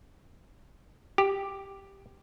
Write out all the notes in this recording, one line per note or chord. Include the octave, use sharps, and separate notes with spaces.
G4